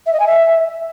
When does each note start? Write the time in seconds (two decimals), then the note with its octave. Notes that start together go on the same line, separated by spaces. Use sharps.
0.06 E5
0.13 D#5
0.20 G#5
0.26 E5